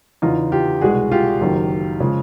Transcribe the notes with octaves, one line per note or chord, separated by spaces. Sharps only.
E2 C#3 E3 D#4 F4
F4 G4
C2 B2 G#3 F#4 G#4
F4 G4
F#1 F#2 D#3 F#3
C#3 F3 G#3